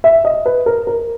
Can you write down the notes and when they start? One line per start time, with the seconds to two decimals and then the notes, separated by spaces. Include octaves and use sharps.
0.04 E5
0.25 D#5
0.46 B4
0.66 A#4
0.87 A#4